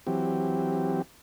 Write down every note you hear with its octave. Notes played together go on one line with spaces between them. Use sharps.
E3 F#3 C4 G4